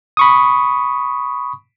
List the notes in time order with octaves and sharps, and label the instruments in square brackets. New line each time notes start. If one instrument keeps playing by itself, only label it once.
[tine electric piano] B5 C#6 D#6